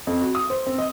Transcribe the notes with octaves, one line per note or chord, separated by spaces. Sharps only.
F2
F#4
D#6
C5
C4
D#5